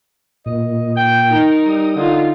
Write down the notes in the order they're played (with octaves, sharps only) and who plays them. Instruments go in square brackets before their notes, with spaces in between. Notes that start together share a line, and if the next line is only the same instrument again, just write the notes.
[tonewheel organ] A#2 [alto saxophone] D#5
[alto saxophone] G5 [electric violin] G6
[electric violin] D#4 A#4
[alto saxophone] G3 [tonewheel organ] D#6
[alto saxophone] D3 [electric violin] D#4 F4